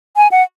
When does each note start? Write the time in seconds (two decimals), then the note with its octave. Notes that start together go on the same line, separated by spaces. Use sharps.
0.17 G#5
0.32 F#5